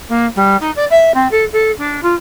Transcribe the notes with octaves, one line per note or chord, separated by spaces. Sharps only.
A#3
G3
D#4
D5
E5
C4
A4
A4
D4
F4